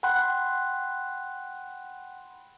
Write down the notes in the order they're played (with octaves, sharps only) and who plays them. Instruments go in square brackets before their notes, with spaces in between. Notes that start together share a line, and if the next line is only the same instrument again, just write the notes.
[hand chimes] F#5 G5 B5 C6 F#6